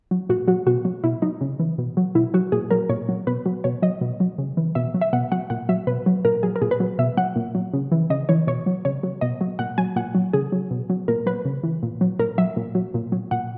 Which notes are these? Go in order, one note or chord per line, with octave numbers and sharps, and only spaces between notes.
F#3
A#2 F#4
F#3 F#4
B2 F#4
F#3
B2 E4
F#3 D#4
C#3
E3
B2
F#3
B2 E4
F#3 F#4
A#2 G#4
F#3 A#4
A#2 C#5
F#3
B2 B4
F#3
B2 C#5
F#3 D#5
B2
F#3
C#3
E3
B2 E5
F#3
E5
B2 F#5
F#3 F#5
A#2 F#5
F#3 E5
B2 B4
F#3
A#2 A#4
F#3 G#4
A#4
A#2 G#4
B4
F#3
B2 E5
F#3 F#5
A#2
F#3
C#3
E3
C#3 D#5
E3 C#5
B2 C#5
F#3
C#3 C#5
F#3
B2 D#5
F#3
A#2 F#5
F#3 G#5
A#2 F#5
F#3
C#3 G#4
F#3
B2
F#3
A#2 A#4
F#3 B4
C#3
E3
A#2
F#3
A#2 A#4
F#3 E5
A#2
F#3
A#2
F#3
A#2 F#5